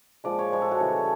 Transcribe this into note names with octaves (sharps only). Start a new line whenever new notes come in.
A#2 F3 G#3 D5
C#5
A#2 F3 G#3 C#5
A4
F#4
C#3 E3 G3